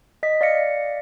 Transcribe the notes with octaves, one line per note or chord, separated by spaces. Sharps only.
D#5 B6
D5 F5 A#6 C#7